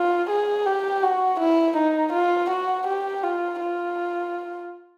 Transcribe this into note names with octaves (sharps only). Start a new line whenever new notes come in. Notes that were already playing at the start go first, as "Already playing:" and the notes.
Already playing: F4
G#4
G4
F#4
E4
D#4
F4
F#4
G4
F4
F4